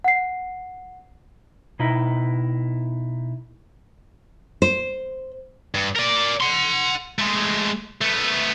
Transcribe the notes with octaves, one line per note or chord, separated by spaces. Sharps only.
F#5 C7
B2 D#4 E4
C5
G2
A#4 D5
F#5 C6
G#3 A3
A3 B3